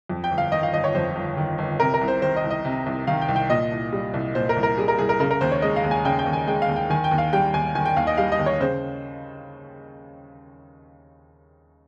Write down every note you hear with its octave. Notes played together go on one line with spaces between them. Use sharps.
F2
G5
G1
F5
D#3 D#5
F5
G1 D#5
C#5
F2 C5
G1
D#3
G1
C3 A#4
A#4
C2
C5
D#3 C5
D#5
C2
D#5
C3
C2
D#3 F5
G5
C2
G5
A#2 D#5
C2
G3
C2
A#2 C5
A#4
C2
A#4
G3 G#4
A#4
C2 G#4
A#4
C#3 A#4
A#4
D#2 C5
C#5
G#3 D#5
F5
D#2
G#5
C#3 G5
G5
D#2
G#5
G#3 G5
F5
D#2
G5
D#3 G#5
G5
D#2
F5
G3 G5
D#2 G#5
D#3 G#5
G5
D#2 F5
D#5
G3 F5
D#5
D#2
C#5
C#3 C5